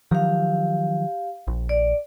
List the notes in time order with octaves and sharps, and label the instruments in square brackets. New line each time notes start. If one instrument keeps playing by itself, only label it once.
[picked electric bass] D#3 F3 F#3 [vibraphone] G4 F5
[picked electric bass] A#1
[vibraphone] D5